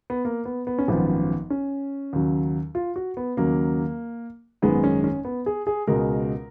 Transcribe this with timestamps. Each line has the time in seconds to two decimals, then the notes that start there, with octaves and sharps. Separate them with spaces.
0.10 B3
0.25 A#3
0.45 B3
0.67 B3
0.78 C#4
0.88 G#1 F#2 F3 B3
1.50 C#4
2.13 D#2 C#3 F#3
2.75 F4
2.96 F#4
3.17 B3
3.37 D#2 C#3 F#3 A#3
4.62 G#1 F#2 D#3 G#3 B3
4.84 C#4
5.04 C#4
5.25 B3
5.46 G#4
5.67 G#4
5.87 C#2 B2 G#3 A#4